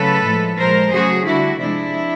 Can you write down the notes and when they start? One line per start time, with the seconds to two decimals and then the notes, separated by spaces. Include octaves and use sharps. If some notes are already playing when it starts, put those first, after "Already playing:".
Already playing: C#3 F#3 A3 A4 B4
0.24 A2 F3 G#3
0.58 A#2 F3 G#3 A#4 C5
0.92 C#3 F#3 A3 F#4 G#4
1.26 D3 G3 E4 F#4
1.60 C3 F3 G#3 D4 E4